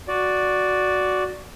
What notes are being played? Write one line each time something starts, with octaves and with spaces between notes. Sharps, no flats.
F#4 D5